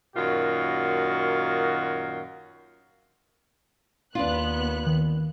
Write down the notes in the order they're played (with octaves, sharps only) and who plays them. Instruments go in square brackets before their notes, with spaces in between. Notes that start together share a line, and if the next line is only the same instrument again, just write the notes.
[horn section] F#2 A#2 D#3 F4 F#4
[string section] D#2 B3 F#6 [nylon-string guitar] D4 F4
[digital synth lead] D#3